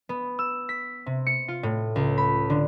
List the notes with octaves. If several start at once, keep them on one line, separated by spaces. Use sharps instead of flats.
B3
E6
B6
C3
C#7
F4
A2
C#2
B5
D3